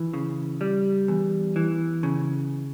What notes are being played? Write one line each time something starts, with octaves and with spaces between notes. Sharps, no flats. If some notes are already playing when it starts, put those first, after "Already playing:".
Already playing: E3
C#3
G3
E2
E3
C#3